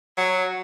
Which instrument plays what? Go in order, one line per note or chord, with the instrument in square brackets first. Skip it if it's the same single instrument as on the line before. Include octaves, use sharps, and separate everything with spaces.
[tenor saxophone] F#3